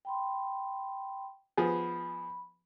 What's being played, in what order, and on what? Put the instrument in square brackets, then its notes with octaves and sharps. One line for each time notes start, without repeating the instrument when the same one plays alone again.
[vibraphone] G5 B5 C6
[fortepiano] F3 B3 G#4 [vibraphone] B5